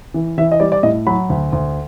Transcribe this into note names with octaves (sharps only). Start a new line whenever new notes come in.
E3
E3 E5
D#5
G3 D5
D5
A2 D#5
F#3 B5
D2
D2